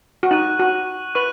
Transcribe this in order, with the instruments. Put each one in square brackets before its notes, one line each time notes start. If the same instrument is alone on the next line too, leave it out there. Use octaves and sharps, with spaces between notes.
[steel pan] F#4
[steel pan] D#4 [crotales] C#6 F#6 D#7 F#7
[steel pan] F#4
[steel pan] B4 [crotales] C#6 F#6 D#7 F#7